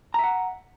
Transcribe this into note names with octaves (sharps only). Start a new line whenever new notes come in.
E5 F#5 A#5